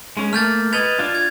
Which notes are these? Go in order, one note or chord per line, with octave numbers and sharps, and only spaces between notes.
G#3 C#4
A3 A#3 F6 G6 A6
B4 D#5 G#6 A6 F7
D4 F4
G#6